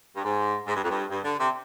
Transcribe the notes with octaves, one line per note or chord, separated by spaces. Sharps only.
G2
G#2
G#2
G2
F2
G2
G2
D3
C3